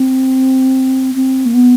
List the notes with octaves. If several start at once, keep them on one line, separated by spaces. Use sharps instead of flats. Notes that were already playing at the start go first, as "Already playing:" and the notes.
Already playing: C4
C4
A#3
B3